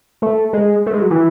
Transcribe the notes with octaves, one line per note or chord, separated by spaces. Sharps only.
A3
G#3
A3
G#3
F#3
E3